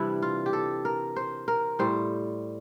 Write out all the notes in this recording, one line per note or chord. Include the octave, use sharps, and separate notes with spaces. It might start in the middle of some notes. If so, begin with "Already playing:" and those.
Already playing: C3 E3 G3 D4 E4
F4
G4
A4
A#4
C5
A#4
A2 G3 C5